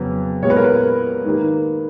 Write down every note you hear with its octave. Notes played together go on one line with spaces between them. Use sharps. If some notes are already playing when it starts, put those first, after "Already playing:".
Already playing: F2 C#3 F#3 B3
A#2 G#3 B3 C#5
B4
A#4
B4
G#2 D#3 A#3